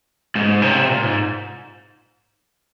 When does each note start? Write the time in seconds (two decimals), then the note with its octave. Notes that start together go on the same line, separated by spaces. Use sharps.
0.35 G#2
0.62 C3
0.88 A#2
1.02 G#2